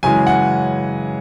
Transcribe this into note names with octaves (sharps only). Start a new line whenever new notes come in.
F#2 C#3 E3 G#3 G#5
F#5